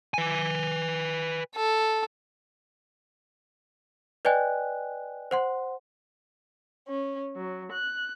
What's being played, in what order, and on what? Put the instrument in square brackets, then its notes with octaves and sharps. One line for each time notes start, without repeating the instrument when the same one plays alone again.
[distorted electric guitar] B4 G#5
[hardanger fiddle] A4
[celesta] B4 D5 D#5 G5 G#5 F#6
C5 F#5 C6
[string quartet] C#4
F#3
F#6